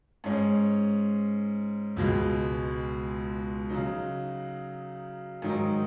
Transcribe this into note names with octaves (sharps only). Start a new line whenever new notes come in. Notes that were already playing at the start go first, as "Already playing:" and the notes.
G#2 G#3 C#4
C#2 B2 G#3
C#3 F#3 D#4
G#2 D#3 F#3 D#4